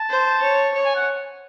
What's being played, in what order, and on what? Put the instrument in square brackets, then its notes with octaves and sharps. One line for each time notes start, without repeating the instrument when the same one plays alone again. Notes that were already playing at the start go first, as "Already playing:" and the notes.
Already playing: [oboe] A5
[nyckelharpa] C5
C#5
C#5
[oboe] G#5
F#5